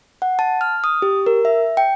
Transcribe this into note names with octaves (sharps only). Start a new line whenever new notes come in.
F#5
A5
F6
D#6
G4
A#4
E5
G5